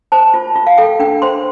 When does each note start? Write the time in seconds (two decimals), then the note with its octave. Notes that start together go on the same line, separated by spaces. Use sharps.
0.12 C5 A5
0.34 F4
0.56 F4
0.67 F5
0.78 A4 G5
1.00 D4 G5
1.22 C5 C6